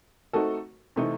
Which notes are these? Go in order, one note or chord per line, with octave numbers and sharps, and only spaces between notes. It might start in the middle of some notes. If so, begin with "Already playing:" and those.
A3 C4 D#4 F#4 A4
C3 E3 A3 C4 D#4